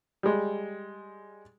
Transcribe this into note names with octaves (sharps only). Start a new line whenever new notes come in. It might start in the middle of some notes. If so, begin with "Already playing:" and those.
G3 G#3